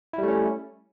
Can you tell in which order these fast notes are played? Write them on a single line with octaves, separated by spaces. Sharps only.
E4 G3 A3 C#4